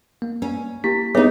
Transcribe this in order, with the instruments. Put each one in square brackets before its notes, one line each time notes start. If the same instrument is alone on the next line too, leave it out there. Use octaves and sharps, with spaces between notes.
[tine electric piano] A#3
[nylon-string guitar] C#4
[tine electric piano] A#3 B6 [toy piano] E4 G4
[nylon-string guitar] B3 D#4 [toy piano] G#4 C#5 E5